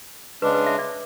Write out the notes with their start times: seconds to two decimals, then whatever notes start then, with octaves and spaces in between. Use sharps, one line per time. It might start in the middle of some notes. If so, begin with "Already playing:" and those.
0.42 C#3 G#3 D4 B4
0.55 B4
0.67 E5
0.79 D5